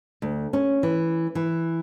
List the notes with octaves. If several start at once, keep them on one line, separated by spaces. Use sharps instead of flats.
D2
C#4
E3
E3